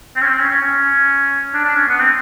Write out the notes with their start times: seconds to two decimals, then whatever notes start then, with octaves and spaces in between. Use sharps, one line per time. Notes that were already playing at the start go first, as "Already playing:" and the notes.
0.16 C4
0.21 C#4
0.26 C4
0.38 C#4
0.50 C#4
0.61 C#4
1.53 D4
1.64 D4
1.76 C#4
1.88 B3
1.99 C4